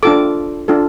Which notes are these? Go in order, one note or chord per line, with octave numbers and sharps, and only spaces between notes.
D4 F4 A4 D6
D4 F4 A4